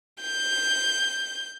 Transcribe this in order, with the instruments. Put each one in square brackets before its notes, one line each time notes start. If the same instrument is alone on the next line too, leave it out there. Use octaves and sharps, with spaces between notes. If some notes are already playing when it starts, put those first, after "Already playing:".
[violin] G6